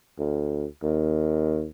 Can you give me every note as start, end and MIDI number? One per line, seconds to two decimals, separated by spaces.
0.19 0.65 38
0.83 1.67 39